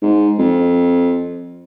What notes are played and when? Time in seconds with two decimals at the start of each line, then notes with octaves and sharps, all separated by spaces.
0.02 G#2
0.39 F2